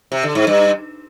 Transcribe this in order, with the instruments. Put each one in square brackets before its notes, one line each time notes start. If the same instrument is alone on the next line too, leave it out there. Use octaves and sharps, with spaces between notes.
[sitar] C3
D3
G#2
G2